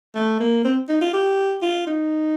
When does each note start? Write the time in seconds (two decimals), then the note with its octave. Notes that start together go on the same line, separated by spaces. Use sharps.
0.15 A3
0.40 A#3
0.65 C4
0.89 D#4
1.01 F4
1.13 G4
1.62 F4
1.87 D#4